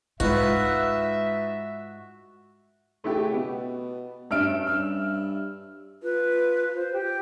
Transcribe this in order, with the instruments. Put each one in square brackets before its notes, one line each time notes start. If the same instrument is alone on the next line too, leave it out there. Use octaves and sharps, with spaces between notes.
[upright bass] G#2 G#3 [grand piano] D#4 F4 B4 [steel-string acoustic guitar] F#4 [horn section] E5
[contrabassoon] C#3 [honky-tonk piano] A3 E4 G4
[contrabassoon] B2 [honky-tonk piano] B3
[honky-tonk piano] G2 E6 D7 [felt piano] C#4 E5 F6
[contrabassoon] G2 [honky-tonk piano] E6
[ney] F4 [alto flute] B4
[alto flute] C5
G4